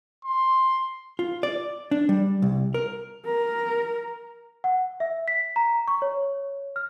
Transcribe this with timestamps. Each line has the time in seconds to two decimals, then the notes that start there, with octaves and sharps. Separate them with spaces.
0.25 C6
1.19 F4
1.43 D5
1.91 D4
2.09 G3
2.42 C2
2.74 A#4
3.25 A#4
4.64 F#5
5.00 E5
5.28 B6
5.56 A#5
5.88 C#6
6.02 C#5
6.76 F6